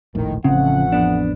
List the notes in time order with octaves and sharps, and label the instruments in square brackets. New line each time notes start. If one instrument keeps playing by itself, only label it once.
[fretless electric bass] E1 A#1 A2 [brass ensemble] D#3
[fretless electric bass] A1 C4 [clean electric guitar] C#3 [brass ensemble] F3 A3 F#5
[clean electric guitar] F2 B3 D4